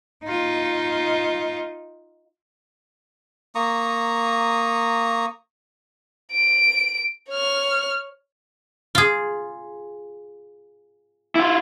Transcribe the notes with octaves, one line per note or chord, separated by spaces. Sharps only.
D#4 F4
A#3 A#5 C#6 D#6
D7
C#5 F6
F4 G#4
E4 F4